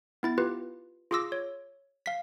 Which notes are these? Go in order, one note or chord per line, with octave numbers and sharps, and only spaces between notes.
B3 E4 A6
F4 G4 B4
F4 G#4 C6 D6 E6 A#6
C#5
F5 B6